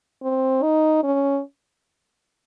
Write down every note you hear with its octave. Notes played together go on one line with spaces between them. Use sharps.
C4
D#4
C#4